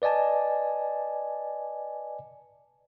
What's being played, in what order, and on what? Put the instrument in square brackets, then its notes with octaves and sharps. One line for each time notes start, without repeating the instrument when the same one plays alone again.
[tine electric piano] B4 D5 D#5 G#5 A5